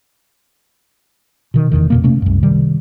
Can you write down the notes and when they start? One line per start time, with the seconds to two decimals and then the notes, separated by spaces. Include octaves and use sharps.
1.54 B2 D#3
1.72 F1 A#1 E2 D#3
1.90 F2 B2 A#3
2.04 C3 A3 A#3 C#4
2.22 C2 F#2
2.43 C3 D#3 G3